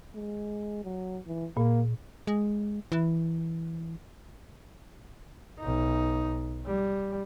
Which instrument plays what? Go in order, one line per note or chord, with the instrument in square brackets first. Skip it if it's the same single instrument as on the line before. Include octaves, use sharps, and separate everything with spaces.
[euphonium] G#3
F#3
E3
[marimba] A#2 [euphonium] A#3
[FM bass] G#3
E3
[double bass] B1 D#4
G3